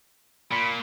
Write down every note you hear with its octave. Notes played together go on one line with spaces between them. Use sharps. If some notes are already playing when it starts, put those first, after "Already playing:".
A#2 B5